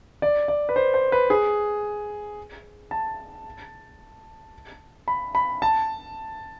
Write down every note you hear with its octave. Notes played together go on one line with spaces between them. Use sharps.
D5
D5
B4
C5
C5
B4
G#4
A5
B5
B5
A5